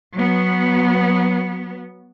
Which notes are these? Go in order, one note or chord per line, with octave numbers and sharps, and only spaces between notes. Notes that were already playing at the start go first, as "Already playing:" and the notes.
F#3 B3